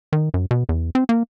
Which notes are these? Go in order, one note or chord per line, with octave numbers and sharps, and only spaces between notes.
D#3
F#2
B2
E2
C4
A#3